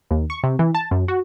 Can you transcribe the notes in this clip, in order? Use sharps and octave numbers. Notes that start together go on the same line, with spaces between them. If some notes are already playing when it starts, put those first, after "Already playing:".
D#2
C#6
C3
E3
A5
F#2
F#4